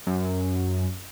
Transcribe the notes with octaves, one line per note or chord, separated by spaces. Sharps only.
F#2